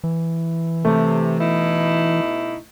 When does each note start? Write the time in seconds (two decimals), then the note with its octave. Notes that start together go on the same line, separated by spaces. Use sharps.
0.04 E3
0.85 C3 A3
1.40 B2 D#4 E4